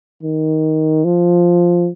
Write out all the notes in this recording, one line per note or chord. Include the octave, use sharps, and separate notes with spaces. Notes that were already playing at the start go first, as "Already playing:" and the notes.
D#3
F3